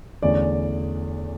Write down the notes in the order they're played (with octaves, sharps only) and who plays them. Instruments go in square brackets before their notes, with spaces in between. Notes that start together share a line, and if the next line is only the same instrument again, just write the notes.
[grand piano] E2 D3 A3 C#4 D5